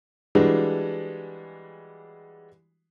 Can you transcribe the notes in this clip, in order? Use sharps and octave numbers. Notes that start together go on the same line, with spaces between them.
E3 G3 G#3 D4 F#4